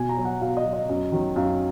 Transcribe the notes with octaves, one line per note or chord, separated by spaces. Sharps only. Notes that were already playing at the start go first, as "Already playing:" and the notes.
Already playing: B2 G#5
A#5
F#3
F#5
B2 F5
D#5
F#3
D#5
F#2
D#3 F#3
F#2 F5